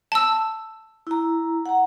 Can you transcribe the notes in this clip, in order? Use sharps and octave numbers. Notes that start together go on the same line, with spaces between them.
A5 E6
E4 A#5
F#5 A#5